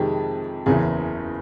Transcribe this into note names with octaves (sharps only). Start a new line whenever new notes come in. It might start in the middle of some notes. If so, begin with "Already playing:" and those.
Already playing: F2 C3 D#3 G#3 G4
F#1 E2 C#3 E3 G#4